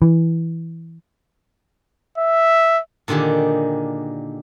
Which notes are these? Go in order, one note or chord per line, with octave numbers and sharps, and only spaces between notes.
E3
E5
A#2 D3 D#3 G4 G#4